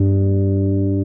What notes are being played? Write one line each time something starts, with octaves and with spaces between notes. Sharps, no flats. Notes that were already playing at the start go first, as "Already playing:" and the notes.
Already playing: G2